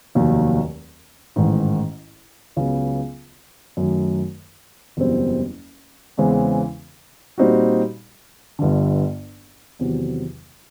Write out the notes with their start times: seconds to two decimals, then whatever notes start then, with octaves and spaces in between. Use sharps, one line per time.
0.15 F1 D#2 D#3 F#3
1.36 A1 G#2 D#3
2.56 C#2 C#3 F#3 B3
3.77 F#2 D#3 F#3 A3
4.97 F#1 E2 B2 G3 C4
6.17 E2 C#3 E3 G#3 C4
7.38 A#2 G3 C4 D#4 F#4
8.59 G1 G2 D3
9.79 E2 C3 D#3 F#3